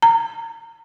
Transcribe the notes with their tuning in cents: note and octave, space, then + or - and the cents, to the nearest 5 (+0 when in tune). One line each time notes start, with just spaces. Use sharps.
A#5 -25